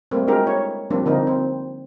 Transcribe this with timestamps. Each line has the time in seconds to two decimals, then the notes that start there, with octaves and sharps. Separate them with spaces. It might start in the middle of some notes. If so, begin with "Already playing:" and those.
0.11 G3 A3 A#3 C4
0.27 G#3 D4 F#4 G4 A#4
0.47 E4 C#5
0.90 F3 G3 A#3 C4 D4
1.06 D3 F3 A#3 C4 D4 D#4
1.27 C4